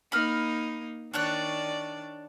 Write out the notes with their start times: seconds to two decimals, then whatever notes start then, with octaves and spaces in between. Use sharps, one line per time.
0.12 A#3 D#4 B5 F6
1.14 D#3 D4 C#5 D5 F#6